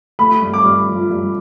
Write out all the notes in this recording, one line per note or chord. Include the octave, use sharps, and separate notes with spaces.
A3 B5
G2
D6
G2
F3
G2